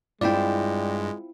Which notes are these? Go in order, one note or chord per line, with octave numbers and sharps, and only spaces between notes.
G2 G#3 C4 E4 F4 D5 G5